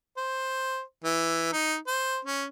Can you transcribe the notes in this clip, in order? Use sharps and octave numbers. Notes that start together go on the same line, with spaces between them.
C5
E3
D#4
C5
C#4